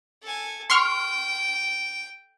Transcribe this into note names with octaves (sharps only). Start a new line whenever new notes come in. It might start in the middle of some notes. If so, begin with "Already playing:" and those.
A4 G#5
G5 C6 C#6 F6